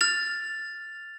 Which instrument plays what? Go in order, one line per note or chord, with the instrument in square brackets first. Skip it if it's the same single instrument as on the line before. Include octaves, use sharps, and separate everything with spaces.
[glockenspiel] F6 A6 F7